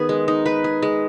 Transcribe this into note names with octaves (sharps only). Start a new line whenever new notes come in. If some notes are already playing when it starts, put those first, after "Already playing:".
Already playing: D#3 B3 G#4 B4
G#3
D#4
B4
G#4
G#3